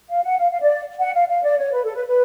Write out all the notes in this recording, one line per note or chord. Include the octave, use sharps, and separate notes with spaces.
F5
F#5
F5
F5
D5
F#5
F5
F5
D5
C#5
B4
A4
B4
B4